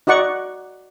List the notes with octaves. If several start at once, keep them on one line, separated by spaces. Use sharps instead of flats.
D#4 F#4 D5 F#5 C#6